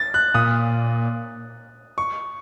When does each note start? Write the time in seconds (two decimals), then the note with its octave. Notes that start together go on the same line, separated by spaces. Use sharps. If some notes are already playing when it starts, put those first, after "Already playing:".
Already playing: A6
0.14 F#6
0.34 A#2 D#6
1.98 C#6